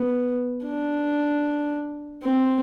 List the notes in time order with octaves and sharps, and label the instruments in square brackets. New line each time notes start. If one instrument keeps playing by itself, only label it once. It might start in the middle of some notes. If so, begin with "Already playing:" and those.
Already playing: [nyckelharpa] B3
D4
C4